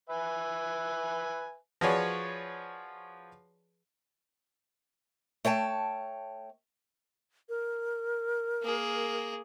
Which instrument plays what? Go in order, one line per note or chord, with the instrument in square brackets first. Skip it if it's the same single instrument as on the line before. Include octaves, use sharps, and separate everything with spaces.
[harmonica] B4 E5 G#5
[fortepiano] F3 F#4 G#4 B4 C#5 D5
[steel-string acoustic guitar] A3 C#5 G5 A5
[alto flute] A#4
[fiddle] A#3 G#4